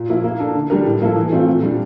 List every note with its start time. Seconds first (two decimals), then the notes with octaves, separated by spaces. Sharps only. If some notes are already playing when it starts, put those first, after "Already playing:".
Already playing: A#2
0.09 F3 A#3 E4
0.24 A#3
0.39 D4 A4
0.55 D3
0.70 G3 D4 G4 A#4
0.85 A2
1.01 F3 A#3 E4 A4
1.16 E3
1.32 A3 C4 F4
1.47 A#2
1.63 G3 D4